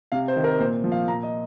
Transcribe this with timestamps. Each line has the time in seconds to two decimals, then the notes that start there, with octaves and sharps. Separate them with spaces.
0.12 C3 F5
0.28 C5
0.36 D#3
0.44 A#4
0.59 A#2 C5
0.84 F3
0.92 F5
1.07 A#2 A#5
1.23 D#5